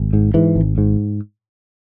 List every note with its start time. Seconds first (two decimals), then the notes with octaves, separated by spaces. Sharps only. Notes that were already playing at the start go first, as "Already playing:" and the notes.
Already playing: G#1
0.13 G#2
0.34 G#2 E3
0.56 G#1
0.78 G#2